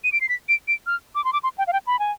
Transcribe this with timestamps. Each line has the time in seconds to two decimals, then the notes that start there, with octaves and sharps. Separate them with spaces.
0.04 D#7
0.12 D7
0.21 C7
0.29 B6
0.49 D7
0.68 D7
0.87 F6
1.15 D6
1.24 C6
1.33 D6
1.43 C6
1.58 G5
1.67 F5
1.73 G5
1.87 B5
1.99 G#5